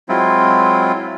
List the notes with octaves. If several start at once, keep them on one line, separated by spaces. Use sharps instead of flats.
F#3 G#3 C4 E4 F4